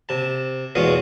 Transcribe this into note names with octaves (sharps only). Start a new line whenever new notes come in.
C3 A5
E2 B2 G#3 F4 C#5 D#6